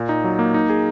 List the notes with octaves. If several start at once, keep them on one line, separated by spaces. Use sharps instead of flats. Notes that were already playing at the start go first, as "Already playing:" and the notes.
Already playing: A#2
D#4
F#3
A#3
D#4
G#4